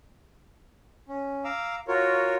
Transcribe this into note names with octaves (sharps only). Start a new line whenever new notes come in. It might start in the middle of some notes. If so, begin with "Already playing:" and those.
C#4
F5 A#5 D6 E6
F4 F#4 A#4 C#5